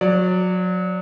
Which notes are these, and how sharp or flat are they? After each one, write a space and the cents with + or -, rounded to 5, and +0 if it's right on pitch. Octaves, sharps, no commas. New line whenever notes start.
F#3 -25 D5 +0